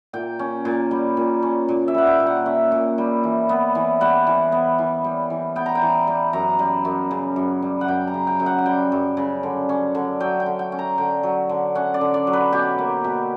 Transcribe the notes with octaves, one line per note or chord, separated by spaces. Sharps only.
A#2 G5
C#4
A#2
G3
A#2
C#4
A#2
E5
G3 F#5
G5
A#2
F#5
C#4 E5
A#2
G3
E3
B3
E3
G3 F#5
E3
B3
E3
G3
E3
B3 G5
A#5
G5
E3
G3
F#2 A#5
G3
F#2
C#3
F#2
G3
F#5
F#2 G5
A#5
C#3
G5
F#2
F#5
F#5
G3 G5
F#2
C#3
D3
C#4
D3
F#3 G5
G5
D3
G5
C#4
A#5
D3 G5
F#3
D3
C#4 F#5
D5
D3
D5
F#3
B4
B2 G4
A#3
B2